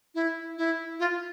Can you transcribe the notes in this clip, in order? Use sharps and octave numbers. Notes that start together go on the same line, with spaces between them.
E4
E4
F4